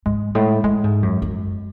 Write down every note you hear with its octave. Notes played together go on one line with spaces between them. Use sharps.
G#2 G#3
A2 G#3
A2 G#3
G#2
F#2
F#2